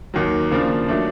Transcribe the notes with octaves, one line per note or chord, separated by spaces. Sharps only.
D#2 D#3 F#3
C#3 F3 A#3 D4
D#3 F#3 A3 D4